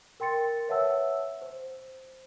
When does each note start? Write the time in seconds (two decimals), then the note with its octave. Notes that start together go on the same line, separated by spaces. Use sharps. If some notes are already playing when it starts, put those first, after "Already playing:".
0.20 A#4 G5 C6 A6 C#7
0.68 B4 C#5 E5 F#5 A5 E6
1.42 C5